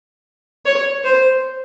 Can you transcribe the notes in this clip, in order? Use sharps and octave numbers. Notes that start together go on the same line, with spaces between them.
C#5
C5